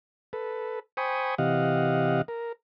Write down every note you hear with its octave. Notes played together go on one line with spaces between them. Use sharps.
A4 B4
C5 G5 G#5 B5 C#6 D#6
C3 E3 G4 D#5 F5 F#5
A#4